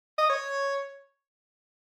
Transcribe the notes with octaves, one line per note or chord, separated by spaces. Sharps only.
D#5
C#5